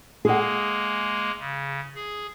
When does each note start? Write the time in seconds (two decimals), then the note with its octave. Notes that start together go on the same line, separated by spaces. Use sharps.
0.25 G#3 A#3 G#4 F#5
1.39 C#3
1.95 G#4